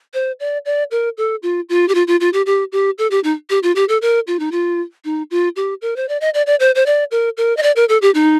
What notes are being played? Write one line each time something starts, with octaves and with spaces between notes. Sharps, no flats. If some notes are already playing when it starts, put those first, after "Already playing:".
C5
D5
D5
A#4
A4
F4
F4
G4
F4
F4
F4
G4
G4
G4
A4
G4
D#4
G4
F4
G4
A4
A#4
F4
D#4
F4
D#4
F4
G4
A#4
C5
D5
D#5
D5
D5
C5
C5
D5
A#4
A#4
D#5
D5
A#4
A4
G4
D#4